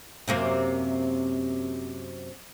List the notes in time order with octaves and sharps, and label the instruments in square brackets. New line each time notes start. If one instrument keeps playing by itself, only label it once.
[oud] F#2 C3 A#3